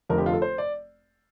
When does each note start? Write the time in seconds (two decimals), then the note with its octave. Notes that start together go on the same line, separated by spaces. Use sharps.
0.10 F1 F2 D3 F3 A#4
0.18 G4
0.26 F4
0.33 A4
0.42 C5
0.58 D5